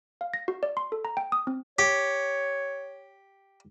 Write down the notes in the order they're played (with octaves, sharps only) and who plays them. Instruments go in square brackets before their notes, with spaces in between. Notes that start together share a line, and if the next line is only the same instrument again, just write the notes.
[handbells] F5
A#6
F#4
D5
C6
A4
A#5
G5
D#6
C4
[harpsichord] G4 [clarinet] C#5